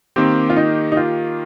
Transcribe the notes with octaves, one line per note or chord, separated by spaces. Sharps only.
D#3 A#3 C4 G4
F4
D#4
D#4
F4